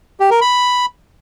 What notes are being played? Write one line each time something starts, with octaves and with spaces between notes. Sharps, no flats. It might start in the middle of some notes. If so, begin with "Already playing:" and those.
G4
A#4
B5